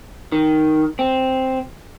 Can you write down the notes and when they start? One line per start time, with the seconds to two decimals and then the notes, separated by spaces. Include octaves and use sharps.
0.32 D#3
0.99 C4